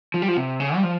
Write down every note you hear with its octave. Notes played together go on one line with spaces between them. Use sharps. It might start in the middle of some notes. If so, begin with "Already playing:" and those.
F3
G3
F3
C3
C#3
G3
F3